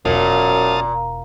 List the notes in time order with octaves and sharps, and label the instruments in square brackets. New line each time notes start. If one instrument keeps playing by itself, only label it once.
[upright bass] E1 E4 [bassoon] F#2 [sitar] A#2 [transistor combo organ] F5 A5 D#6